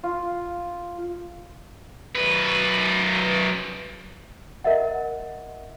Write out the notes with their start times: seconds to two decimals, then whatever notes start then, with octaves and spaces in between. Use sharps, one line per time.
0.04 F4
2.16 F#2 B4
4.64 A#4 D#5 E5 F#5